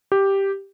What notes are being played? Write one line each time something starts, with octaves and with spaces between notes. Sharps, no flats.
G4